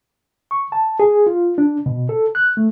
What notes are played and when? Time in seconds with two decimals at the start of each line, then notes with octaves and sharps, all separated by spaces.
0.51 C#6
0.72 A5
1.00 G#4
1.27 F4
1.58 D4
1.86 B2
2.09 A4
2.35 F#6
2.57 A3